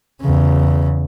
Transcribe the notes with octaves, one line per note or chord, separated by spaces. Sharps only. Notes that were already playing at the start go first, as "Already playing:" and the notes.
E2 C#3